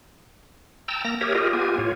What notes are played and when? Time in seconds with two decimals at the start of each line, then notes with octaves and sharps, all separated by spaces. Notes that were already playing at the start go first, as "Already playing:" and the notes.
0.88 G5 A5 A#5 E6
1.05 A#3 A#5 A#6
1.21 G4 A#4 C#5 E5 D#6
1.35 F4 G4 G#4 A#4 D#5
1.53 B3 F4 G4 G#5
1.78 A2 F4 C#5